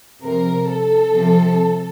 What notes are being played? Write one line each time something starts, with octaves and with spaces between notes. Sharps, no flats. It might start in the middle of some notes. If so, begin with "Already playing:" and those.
C3 F3 A#4
A4
C3 F3